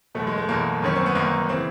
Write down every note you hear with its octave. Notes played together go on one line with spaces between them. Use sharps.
F#1 E2 B2 A3
G#3
A3
F#1 E2 B2 A#3
G1 F#2 D#3 C#4
C4
B3
G1 F#2 D#3 A#3
C#3 E3 C4